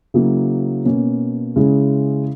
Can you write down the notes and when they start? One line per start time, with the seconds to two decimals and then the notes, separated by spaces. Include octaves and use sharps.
0.14 C#3 F#3 A#3 E4
0.85 B2 A#3 C#4
1.56 C#3 G#3 C#4 E4